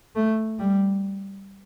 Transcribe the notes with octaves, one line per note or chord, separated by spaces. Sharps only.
A3
G3